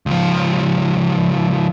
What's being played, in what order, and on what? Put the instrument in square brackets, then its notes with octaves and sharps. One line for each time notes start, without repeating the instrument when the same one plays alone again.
[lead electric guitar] C#2 F3